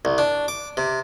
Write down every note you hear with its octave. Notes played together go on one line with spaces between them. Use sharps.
C2
D4
D6
C3